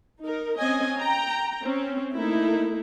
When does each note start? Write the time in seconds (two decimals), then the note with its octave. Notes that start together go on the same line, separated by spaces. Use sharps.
0.22 D#4 A#4
0.57 C4 C#4 D#5 G#5
0.99 G5 A#5
1.62 C4 C#4
2.14 A3 A#3 D#4 E4